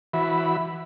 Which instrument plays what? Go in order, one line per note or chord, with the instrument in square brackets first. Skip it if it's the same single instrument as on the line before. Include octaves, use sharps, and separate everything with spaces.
[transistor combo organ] E3 F#4 E5 B5